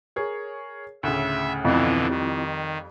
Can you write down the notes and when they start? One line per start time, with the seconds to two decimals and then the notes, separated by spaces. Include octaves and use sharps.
0.16 G#4 A#4 C#5
1.03 D2 A2 C#3 E5
1.65 F2 B2 D3 E3 C4 E4 F4
2.09 D#3 G3